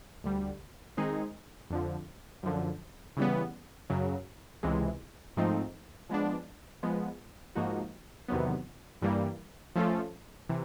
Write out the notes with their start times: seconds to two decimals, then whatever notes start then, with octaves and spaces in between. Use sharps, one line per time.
0.24 D2 D3 G3
0.97 D#3 G#3 C4 D#4 G#4
1.70 F2 D3 F3
2.43 F#2 D3 F3
3.17 C#3 E3 G3 B3
3.90 F#2 C#3 F#3
4.63 C#2 C3 E3 G#3
5.37 G#2 F3 A3 C4 D#4
6.09 F3 G#3 B3 D4
6.83 F3 G#3 B3
7.55 G#2 F3 A#3 D#4 F#4
8.28 E2 C3 D#3 F#3 B3
9.02 G2 E3 G3 A#3
9.76 F3 A3 C#4 F4 A4
10.49 C3 E3